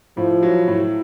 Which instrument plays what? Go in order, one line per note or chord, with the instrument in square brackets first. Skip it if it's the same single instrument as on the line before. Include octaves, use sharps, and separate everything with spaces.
[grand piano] A2 [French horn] F3
[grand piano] F#3
A2